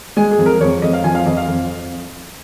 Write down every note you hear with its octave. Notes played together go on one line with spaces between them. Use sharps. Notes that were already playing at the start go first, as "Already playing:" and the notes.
G#3 G#5
G#4
F2
A#4
F2 C#5
F2 D#5
F5
F3 G#5
F5
F2 D#5
F5
F2